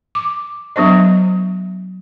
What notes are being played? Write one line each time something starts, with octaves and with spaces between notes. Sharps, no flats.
D6
F#3 B3 D4 C5 D#5